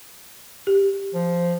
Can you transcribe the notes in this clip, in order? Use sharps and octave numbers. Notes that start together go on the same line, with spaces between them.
G4
F3